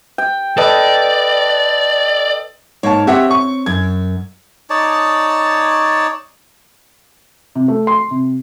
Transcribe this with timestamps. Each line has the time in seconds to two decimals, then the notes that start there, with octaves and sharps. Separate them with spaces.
0.18 G5
0.57 A4 B4 D5 D#5
2.83 G#2 A#3 C#5 A5
3.07 C4 G4 C#5 E5 F#5
3.31 C#6
3.66 F#2 G#6
4.70 D#4 C#5 D5 A5
7.55 C3
7.68 A3
7.87 C6
8.11 C3